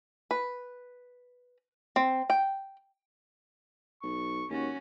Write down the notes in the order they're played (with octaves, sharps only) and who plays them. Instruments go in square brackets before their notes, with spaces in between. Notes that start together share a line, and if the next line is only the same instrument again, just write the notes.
[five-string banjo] B4
C4
G5
[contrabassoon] B1 [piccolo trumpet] C#6
[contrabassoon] D#2 [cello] C#4 F#4